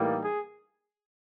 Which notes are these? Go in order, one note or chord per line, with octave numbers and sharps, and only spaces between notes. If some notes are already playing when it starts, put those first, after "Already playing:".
Already playing: A2 E3 G3 A#3 D#4
G#4